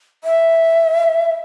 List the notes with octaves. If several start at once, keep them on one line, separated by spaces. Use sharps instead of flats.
E5